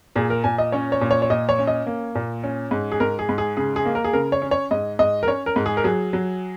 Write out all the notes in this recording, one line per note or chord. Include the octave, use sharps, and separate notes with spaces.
A#2 G#4
A#4
A#2 G#5
D#5
C#4 C#5
C#5
A#2
C#5
C#5
A#2 D#5
C#5
C#4
D#5
A#3
A#2
C#4
G#2
G#4
G#2 A#4
G#4
G#2
G#4
C#3 G#4
G#4
A#3
A#4
G#4
C#3 A#4
C#5
C#4
C#5
G#2 D#5
G#2 D#5
A#4
C#4 C#5
A#4
G#2
G#4
A#4
F#3 G#4
F#3